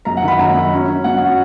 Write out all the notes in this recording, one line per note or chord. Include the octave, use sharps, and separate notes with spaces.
F#2 A#5
F#5
D#3
B5
F#2 A#5
F#3
C#4
C#4
F#3 F#5
C#4